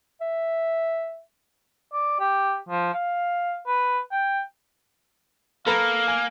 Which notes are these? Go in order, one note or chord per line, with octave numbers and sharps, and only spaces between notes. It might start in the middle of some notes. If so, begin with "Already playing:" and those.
E5
D5
G4
F3
F5
B4
G5
A#3 A4 B4 F5 A#5
G#5